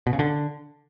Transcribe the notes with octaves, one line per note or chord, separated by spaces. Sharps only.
B2
C#3
D3